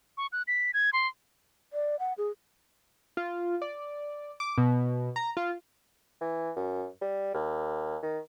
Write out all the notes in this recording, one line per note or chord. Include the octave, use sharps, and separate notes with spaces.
C#6
F#6
B6
G#6
C6
D5
F#5
G#4
F4
D5
D6
B2
A#5
F4
E3
F#2
G3
D#2
D#3